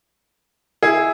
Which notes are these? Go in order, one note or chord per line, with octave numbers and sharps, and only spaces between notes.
E4 G#4